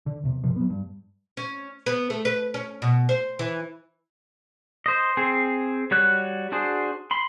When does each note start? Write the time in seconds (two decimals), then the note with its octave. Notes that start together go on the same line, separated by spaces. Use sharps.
0.06 D3
0.24 E2 C3
0.43 A#1 G2 C3 F3
0.56 F#3 B3
0.70 G2
1.37 C#4
1.86 B3
2.10 A3
2.25 B4
2.54 C#4
2.82 B2
3.09 C5
3.39 E3
4.86 C5 D#5
5.17 C4 G#4 C5
5.91 G3 F#4 C#5 F#6
6.52 D4 F#4 G#4 C5
7.11 B5 C6